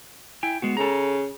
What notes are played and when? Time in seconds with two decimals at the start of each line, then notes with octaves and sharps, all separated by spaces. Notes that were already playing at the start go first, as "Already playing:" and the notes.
0.43 E4 G5 G#5
0.62 G#3 B3 F#4
0.77 C#3 A4 A#5